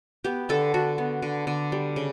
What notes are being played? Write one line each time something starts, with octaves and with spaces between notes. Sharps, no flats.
B3 G4
D3 A4
D3 F#4
B3
D3
D3
G3
C#3